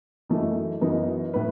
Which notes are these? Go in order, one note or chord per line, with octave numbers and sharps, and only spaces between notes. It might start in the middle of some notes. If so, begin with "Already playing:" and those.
F#2 E3 A3 D#4
F#2 E3 B3 D#4
A2 B4